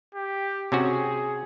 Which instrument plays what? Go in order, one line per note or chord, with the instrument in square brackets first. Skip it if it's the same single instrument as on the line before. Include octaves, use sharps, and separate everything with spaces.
[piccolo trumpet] G4
[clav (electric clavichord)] C3 C#4 F#4 [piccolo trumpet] G#4